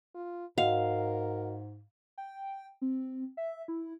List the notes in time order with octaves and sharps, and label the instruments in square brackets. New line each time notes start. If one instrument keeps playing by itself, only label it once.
[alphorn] F4
[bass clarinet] G#2 [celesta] F#4 D#5 F#5 [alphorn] A#4 [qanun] F5
[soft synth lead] G5
C4
E5
E4